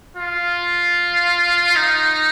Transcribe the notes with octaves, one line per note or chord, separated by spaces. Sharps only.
F4
D#4